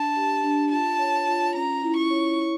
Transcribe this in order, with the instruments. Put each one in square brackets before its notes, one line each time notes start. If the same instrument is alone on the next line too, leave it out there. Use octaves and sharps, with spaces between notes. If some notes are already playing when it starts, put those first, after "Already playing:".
Already playing: [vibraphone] D4 [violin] A5
[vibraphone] G4
D4
[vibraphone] F4 [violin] A5
[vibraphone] C#5
F4
[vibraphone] C#4 [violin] A#5
[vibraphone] E4
[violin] C#6
[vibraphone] C#5
E4